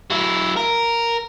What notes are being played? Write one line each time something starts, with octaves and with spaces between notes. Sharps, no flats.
F#3 E4
A#4